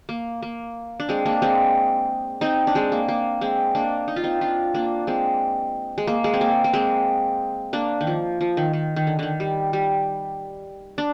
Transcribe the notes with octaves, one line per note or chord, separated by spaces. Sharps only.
A#3
A#3
D4
G#3 C4
A#3 D4
G#3 C4
C4 D#4
D4
G#3 C4
A#3
A#3
G#3 C4
A#3 D4
D#4
F4
C4 D#4
D4 F4
A#3 D4
G#3 C4
G#3
A#3
G#3
C4
A#3
A#3
G#3 C4
A#3 D4
D#3
F3
F3
D#3
D#3
D#3
D3
D3 D#3
G3
G3
D4